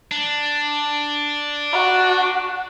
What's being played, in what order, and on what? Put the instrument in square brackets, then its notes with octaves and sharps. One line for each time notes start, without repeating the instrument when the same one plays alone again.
[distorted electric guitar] D4
[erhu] F#4